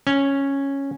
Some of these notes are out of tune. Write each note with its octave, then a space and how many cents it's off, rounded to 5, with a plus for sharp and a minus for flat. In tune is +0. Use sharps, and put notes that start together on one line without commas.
C#4 -5